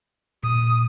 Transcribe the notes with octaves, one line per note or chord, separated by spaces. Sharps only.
A#2 D#6